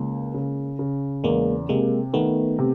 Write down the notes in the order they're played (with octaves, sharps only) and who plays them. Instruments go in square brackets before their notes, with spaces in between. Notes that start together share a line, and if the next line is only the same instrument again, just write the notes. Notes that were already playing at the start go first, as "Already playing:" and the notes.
Already playing: [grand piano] C#2 C#3 [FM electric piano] G#3 A#3
[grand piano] C#3
C#3
[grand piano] E2 [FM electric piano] G#3 A#3
[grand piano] C3 [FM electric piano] G#3 A#3
[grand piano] D#3 [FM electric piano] A3 B3
[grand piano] C3